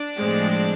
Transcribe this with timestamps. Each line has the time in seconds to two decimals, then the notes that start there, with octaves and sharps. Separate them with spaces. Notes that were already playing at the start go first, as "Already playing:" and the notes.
Already playing: D4 D5
0.18 A2 F3 G#3 C4